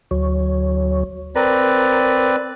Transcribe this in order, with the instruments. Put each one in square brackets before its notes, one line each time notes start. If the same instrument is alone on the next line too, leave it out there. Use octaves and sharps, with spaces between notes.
[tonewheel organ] D2 F#3 C#5
[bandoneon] C4 B4 D5 [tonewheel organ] A#4 A#5